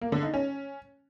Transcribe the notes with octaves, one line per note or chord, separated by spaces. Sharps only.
A#3
D3
D#4
C#4